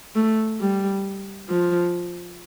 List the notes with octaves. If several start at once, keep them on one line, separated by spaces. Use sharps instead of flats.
A3
G3
F3